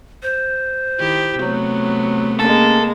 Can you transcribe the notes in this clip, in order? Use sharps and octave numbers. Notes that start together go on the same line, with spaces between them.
C5
D#3 E4 G4
C3 F#3 A3 B3
G#3 A#3 C#4 A4